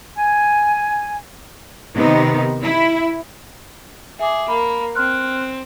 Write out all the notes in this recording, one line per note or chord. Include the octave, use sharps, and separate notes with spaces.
G#5
C3 D#3 B3 D#4
E4
G#4 E5 D6
A#3 B5
C4 C6 F6 F#6